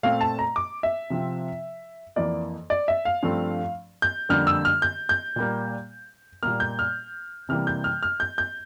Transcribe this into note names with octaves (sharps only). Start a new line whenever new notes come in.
A#2 A3 C4 F5
A5
A#5
D6
E5
C3 F3 C4
F2 E3 A#3 D5
D5
E5
F5
G2 F3 A3 C4
G6
F2 D3 G3 A#3 F6
E6
F6
G6
G6
A#2 G3 A#3
A#2 G3 A#3 F6
G6
F6
C3 E3 G3 A#3 F6
G6
F6
F6
G6
G6